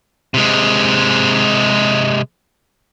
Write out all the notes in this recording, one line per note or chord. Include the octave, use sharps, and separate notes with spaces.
C3 G#3